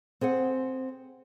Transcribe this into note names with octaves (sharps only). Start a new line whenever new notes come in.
C4 G#4 C5 F#5